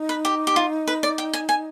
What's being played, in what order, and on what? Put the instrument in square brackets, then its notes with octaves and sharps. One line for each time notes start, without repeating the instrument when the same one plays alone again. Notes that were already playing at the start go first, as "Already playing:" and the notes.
Already playing: [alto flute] D#4
[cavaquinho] B4
G4
G4
F4
B4
D5
G5
G#5
G#5